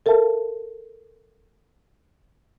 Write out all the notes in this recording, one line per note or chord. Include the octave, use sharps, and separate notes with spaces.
A4 A#4 E5 F5 A5